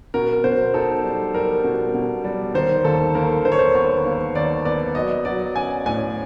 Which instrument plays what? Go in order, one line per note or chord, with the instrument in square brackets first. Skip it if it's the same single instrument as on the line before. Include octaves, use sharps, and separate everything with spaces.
[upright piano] B2 A#4
B2 C5
D#4 A4
G3
G3 A#4
B2
B2
G3
D#3 C5
D#2 A4
D#2 A#4
D#3 C5
C#5
C5
B3 C#5
D#2
D#2 D5
B3 D5
F#3 D#5
F#3 D5
C#4 G#5
A2 G#5